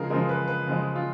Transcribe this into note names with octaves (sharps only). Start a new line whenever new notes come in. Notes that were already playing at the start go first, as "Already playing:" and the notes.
Already playing: C#3 F3 G#3 G#4 A#4
C#3 F3 G#3 A#4
B4
B4
C#3 F3 G#3
F4